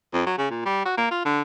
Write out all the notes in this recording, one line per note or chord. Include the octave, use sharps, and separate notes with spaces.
F2
F#3
C#3
A#2
G3
F#4
A#3
F4
D3